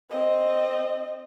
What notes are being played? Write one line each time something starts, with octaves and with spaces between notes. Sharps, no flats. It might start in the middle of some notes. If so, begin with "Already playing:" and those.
C4 D#5